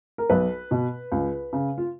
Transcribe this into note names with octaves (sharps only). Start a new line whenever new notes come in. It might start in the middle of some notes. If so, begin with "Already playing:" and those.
A#4
B1 B4
B2
C#2
C#3
F4